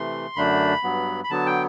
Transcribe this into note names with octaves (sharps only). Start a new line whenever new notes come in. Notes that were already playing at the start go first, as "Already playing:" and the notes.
Already playing: C3 E3 A3 C6
F#2 D3 A3 D4 B5
G2 F#3 B3
B5
D3 F#3 B3 A5
G5